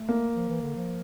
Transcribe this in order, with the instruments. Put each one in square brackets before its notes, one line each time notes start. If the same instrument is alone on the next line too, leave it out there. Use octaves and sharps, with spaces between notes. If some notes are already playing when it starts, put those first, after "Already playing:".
Already playing: [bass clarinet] A3
[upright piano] A#3
[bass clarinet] F3
E3
D3
F3